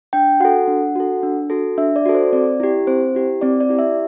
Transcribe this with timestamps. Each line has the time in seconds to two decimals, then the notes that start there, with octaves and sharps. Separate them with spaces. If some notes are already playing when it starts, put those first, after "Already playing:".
0.13 D4 G5
0.40 F#4 A4 F#5
0.68 D4
0.96 F#4 A4
1.23 D4
1.50 F#4 A4
1.78 D4 E5
1.96 D5
2.06 F#4 A4
2.15 C5
2.33 C4 D5
2.60 E4 G4
2.87 C4 C5
3.15 E4 G4
3.41 C4 D5
3.60 D5
3.69 E4 G4
3.79 E5